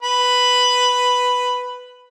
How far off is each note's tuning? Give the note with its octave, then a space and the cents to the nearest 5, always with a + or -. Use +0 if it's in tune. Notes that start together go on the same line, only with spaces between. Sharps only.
B4 +5